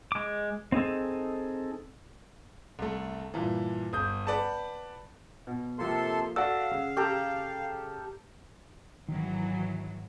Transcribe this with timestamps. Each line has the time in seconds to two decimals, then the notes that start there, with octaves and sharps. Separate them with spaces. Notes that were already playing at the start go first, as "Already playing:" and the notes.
0.12 G#3 D6
0.72 C4 D#4 G#4 A4
2.79 C2 A3
3.34 G2 A#2 E3
3.93 G1 D#6 G6
4.27 B4 D5 F#5 A5
5.47 B2
5.79 C3 F3 A#3 A4 C6
6.36 F#4 A4 D5 F5 F#5 E6
6.71 C#3
6.97 G4 A4 A#5 F6
9.09 G#1 D#3 E3 F#3